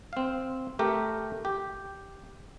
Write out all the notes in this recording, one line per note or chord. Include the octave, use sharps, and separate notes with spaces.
C4 F5
A3 G4 A#4
G4